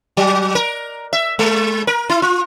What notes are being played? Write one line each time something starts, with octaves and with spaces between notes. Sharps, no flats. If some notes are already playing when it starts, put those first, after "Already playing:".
F#3
A#4
E5
G#3
A#4
E4
F4